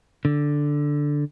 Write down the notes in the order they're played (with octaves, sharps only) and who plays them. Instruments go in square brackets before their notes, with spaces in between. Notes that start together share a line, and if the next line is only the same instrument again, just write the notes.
[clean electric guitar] D3